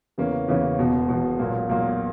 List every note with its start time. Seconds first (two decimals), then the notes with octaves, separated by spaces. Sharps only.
0.18 E2 C#3 E3 A#3 C#4
0.48 E2 C#3 E3 A#3 C#4
0.78 E1 E2 B2
1.09 E1 E2 B2
1.39 B1 A#2 A#3
1.69 B1 A#2 A#3